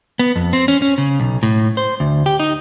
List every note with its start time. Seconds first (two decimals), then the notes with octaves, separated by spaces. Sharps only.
0.19 B3
0.36 F2
0.53 C4
0.68 C#4
0.82 C#4
0.98 C#3
1.20 B1
1.43 A2
1.77 C5
2.00 D2
2.26 G4
2.40 D#4